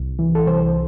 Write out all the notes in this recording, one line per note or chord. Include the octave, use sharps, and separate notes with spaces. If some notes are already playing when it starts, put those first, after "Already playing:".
Already playing: C2
E3
A4
C2 C5